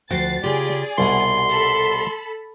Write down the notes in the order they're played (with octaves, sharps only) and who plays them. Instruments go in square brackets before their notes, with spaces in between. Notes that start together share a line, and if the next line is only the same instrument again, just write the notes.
[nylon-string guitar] D2 F3 F#5 [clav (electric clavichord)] F#4 G5 [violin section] A6 C7
[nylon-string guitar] C#3 F4 [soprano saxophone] G4 [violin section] G#4 D5
[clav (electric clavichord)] C2 B2 [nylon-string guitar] G3 F#5 [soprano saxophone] C6
[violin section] A4 B5